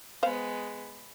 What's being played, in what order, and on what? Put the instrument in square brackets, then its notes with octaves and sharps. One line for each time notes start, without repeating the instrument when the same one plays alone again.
[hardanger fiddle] G#3 B3 [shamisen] C5 F5